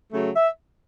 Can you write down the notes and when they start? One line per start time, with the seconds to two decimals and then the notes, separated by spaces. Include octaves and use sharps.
0.13 C#3 F#3 A3
0.35 E5